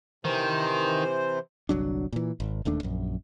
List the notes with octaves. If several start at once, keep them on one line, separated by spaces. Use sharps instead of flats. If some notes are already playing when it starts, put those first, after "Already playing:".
C3 D#3 E3 C5
G1 C2 F#3 D4
A#2 E3
G#1
E1 D#2 A3 D4
A#1 F#2